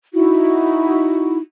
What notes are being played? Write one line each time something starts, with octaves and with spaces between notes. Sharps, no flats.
D#4 E4 F#4